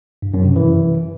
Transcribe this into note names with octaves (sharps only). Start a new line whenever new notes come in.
G2
F#2
C3
E3